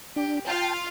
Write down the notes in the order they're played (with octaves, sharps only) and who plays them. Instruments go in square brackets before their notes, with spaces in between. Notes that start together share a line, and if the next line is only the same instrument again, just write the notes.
[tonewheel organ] D4 [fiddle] G4
[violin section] F4 [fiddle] F5 [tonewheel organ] G5 A5